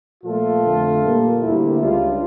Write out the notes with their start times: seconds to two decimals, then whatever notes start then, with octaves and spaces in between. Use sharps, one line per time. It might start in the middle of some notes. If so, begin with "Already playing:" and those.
0.23 A#2 F3 A3 F4 A4
0.63 F2 D3 F3 A3
1.02 A#2 G3 A#3
1.41 D2 D3 G3 A#3 E4 G4
1.80 C#2 C#3 G3 D4 F4